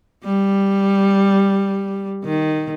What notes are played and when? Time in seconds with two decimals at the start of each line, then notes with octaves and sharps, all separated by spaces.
0.24 G3
2.24 D#3